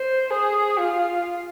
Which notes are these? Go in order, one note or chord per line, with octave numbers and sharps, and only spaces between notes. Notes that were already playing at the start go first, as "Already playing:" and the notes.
Already playing: C5
G#4
F4